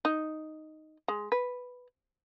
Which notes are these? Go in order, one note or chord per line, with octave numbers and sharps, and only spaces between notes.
D#4
G#3
B4